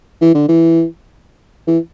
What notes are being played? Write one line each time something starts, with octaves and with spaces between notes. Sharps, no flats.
E3
D3
E3
E3